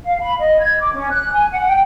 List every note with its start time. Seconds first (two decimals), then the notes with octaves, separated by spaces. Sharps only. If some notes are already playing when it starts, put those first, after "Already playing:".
0.04 F5
0.21 B5
0.40 D#5
0.60 G#6
0.79 D6
0.93 C#4
1.11 F#6
1.33 G#5
1.51 F#5
1.69 G5